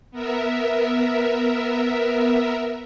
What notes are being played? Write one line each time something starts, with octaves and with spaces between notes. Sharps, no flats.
B3 A#4 E5